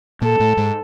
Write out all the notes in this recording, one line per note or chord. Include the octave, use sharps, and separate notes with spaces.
A#2 A#3 A4
A2 A3
G#2 G#3